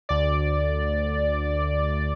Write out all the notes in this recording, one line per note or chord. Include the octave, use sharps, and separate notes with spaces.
D2 D5